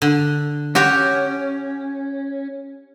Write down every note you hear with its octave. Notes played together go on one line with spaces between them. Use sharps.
D3
C#4 F#4 G4 C#5